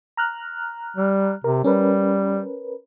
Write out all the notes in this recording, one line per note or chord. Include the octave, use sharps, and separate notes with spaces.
A#5 F6 F#6
G3
C3 A#4
G3 C#4 A#4 B4